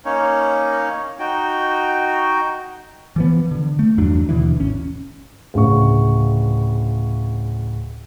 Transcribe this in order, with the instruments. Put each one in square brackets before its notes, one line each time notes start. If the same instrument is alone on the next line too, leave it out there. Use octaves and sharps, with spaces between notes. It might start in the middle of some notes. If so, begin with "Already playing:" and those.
[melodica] A#3 C#4 D#4 C#5
D#4 F#4 G5
[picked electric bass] E3 F3 B3
D3
A3
E2 G2 F#3 D4
D#2 B2 D3 E3
G#1 C#4
[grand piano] D1 C#3 C#6